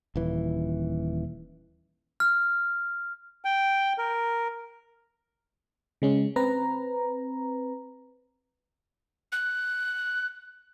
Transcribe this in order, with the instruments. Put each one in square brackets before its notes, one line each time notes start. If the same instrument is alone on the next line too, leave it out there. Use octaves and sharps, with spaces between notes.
[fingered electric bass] D#1 E3
[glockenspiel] F6
[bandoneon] G5
A#4
[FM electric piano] C#3 G#3 C#4
C4 B4 A#5
[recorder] F#6